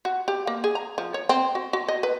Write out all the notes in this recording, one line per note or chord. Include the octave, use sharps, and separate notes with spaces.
F#4
G4
A#3
G#4
A#5
F3
C#5
C4
F#4
F#4
D#5
B4